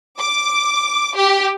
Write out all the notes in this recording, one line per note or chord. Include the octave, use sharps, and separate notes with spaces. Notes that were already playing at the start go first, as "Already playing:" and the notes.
D6
G4